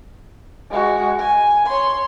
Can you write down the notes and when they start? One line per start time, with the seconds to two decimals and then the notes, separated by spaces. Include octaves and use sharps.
0.70 G#3 F#4
1.19 G#5
1.67 C#5 C6